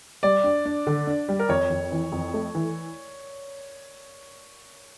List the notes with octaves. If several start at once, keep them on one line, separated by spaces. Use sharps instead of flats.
G3 D5
D4
D4
D3
D4
G3
A#4
F2 C#5
F2
E3
F2
A3
E3